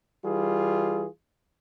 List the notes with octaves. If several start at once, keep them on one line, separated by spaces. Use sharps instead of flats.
E3 G3 F4 G#4